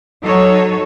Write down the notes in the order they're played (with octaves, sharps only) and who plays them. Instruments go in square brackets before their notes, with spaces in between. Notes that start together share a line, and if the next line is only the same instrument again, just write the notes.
[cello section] F#3 D#4 A4 C#5